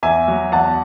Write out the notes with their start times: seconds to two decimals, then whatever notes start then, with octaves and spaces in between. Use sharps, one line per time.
0.03 E2 E5 G#5
0.28 F#3
0.52 E2 F#5 A5